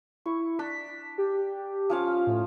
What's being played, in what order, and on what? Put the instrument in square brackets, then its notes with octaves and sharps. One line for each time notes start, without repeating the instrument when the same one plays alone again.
[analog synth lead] E4 [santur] C#6
[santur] D4 [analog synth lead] B6
[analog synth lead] G4
[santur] F3 C#4 F5
[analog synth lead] A2